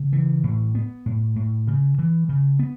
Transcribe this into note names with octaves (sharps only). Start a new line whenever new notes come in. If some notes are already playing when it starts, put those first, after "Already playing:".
Already playing: C#3
E3
A2
B3
A2
A2
C#3
E3
C#3
B3